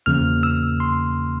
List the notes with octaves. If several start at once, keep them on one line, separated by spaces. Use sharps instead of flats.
E2 C#3 F3 A#3 F6
E6
C6